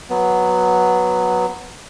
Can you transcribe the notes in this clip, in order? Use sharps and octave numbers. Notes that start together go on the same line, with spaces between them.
F#3 B3